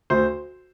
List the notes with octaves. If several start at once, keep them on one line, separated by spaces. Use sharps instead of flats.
D2 C5